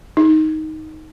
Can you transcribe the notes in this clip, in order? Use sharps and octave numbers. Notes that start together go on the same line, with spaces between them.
D#4